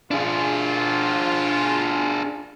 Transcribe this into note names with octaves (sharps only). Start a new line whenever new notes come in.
D4 F4 G#4